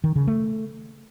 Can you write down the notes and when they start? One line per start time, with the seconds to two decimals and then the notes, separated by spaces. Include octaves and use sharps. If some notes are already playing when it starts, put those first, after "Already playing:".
0.04 D#3
0.16 C#3
0.27 A3